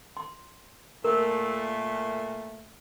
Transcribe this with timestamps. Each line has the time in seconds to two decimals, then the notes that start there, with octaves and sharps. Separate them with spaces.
0.17 C6
1.04 A#2 A3 A#4